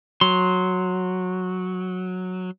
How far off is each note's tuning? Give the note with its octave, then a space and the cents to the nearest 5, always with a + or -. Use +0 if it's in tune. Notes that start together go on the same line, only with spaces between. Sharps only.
F#3 -10 C6 +0